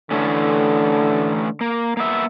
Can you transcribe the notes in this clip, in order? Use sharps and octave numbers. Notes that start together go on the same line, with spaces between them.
D3 E3 A3 C#4
A#3
A#3 B3 E5